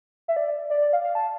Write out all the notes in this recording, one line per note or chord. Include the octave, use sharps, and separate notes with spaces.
E5
D5
D5
D5
F5
F5
A5